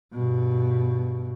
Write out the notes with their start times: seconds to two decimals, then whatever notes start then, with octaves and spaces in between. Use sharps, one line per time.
0.13 G2 B2